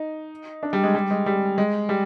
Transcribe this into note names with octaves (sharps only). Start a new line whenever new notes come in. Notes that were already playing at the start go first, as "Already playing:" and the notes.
Already playing: D#4
D4
G3
G#3
G3
G#3
G3
G#3
G3